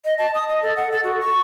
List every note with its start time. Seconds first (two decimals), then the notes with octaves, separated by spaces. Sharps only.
0.05 D#5
0.18 A5
0.34 D#6
0.48 D#5
0.62 A4
0.76 F#5
0.92 A4
1.04 F#4
1.20 C#6